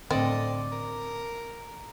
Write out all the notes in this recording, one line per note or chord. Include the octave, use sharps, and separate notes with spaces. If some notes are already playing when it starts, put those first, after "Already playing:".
A2 D3 C4 A4 D5 D#5
A#4